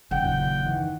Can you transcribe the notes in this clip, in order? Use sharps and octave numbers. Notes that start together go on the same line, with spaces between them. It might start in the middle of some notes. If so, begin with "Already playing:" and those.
C#3 F#3 F#5 G5
F#1 D#2 A#2
D#3 E3